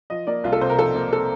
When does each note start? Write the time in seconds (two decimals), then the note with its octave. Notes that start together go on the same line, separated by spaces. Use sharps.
0.10 F3 D#5
0.27 A#3 D5
0.44 C2 F4
0.52 A4
0.61 C3 C5
0.70 A#4
0.78 F3 A4
0.95 A#3
1.13 A4